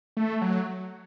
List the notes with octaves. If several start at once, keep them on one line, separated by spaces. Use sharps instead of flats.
A3
F#3